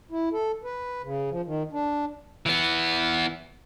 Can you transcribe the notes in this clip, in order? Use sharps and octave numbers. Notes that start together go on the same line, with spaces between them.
E4
A4
B4
C#3
F3
D#3
D4
E3 B3